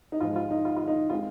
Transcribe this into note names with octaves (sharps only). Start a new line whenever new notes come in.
D#4
G#2 F3 G#3 F4
F4
D#4
F4
F4
D#4
D#3 G#3 C4 F4